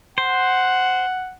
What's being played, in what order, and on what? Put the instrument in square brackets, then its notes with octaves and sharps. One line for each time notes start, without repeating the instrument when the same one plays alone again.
[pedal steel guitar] C5 [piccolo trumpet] F#5